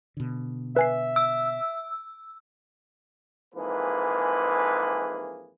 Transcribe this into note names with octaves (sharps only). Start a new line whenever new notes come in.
B2 D3
B4 E5 G#5 C7
E6
F2 G#2 E3 A#3 G#4 B4